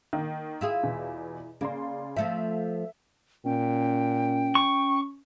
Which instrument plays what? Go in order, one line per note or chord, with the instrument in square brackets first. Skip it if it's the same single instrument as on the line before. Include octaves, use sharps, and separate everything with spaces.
[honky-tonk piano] D#3 A#3
[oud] E4 F4 G#4
[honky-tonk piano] E2 B2
[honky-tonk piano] C#3 D5 C6 [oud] A#3
[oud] F3 A3 C4 [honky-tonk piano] E5
[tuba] A#2 [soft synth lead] C#4 [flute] G5
[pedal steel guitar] C#6